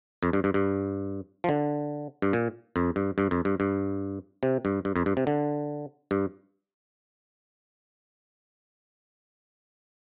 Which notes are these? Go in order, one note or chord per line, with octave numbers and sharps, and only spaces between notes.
F2
G2
G2
G2
F3
D3
G2
A#2
F2
G2
G2
F2
G2
G2
C3
G2
G2
F2
G2
C3
D3
G2